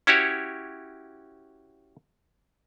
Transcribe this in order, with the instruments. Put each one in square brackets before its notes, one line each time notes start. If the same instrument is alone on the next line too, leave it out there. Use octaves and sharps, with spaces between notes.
[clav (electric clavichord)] C#4 E4 F#4 G4 C#5